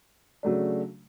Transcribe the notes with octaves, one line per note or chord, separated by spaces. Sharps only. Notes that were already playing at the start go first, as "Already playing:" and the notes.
C#3 F#3 A3 D4